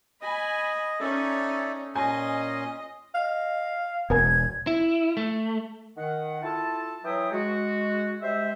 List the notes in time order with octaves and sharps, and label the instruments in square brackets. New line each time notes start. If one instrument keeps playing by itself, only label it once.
[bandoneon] D#5 D#6 [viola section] G#5 B5
[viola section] C#4 D#4 [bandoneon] A4 D5 E5
[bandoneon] A#2 C#4 C6 [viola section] D#5 [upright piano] G#5
[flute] D#5 [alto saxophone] F5
[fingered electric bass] E1 [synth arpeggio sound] B3 A#4 G#5 [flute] G#6
[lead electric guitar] E4
A3
[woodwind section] D#3 F#5
E4 F4 A4 A5
E3 F#3 E5 G5 D#6
G#3 F#4
G3 G#3 C5 E5